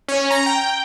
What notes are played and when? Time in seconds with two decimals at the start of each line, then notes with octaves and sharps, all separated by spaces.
0.08 C#4
0.30 A#5
0.46 G5